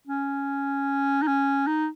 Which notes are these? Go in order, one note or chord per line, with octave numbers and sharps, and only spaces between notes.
C#4
D#4
C#4
D#4